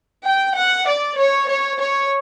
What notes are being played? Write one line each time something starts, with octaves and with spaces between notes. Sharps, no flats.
G5
F#5
D5
C#5
C#5
C#5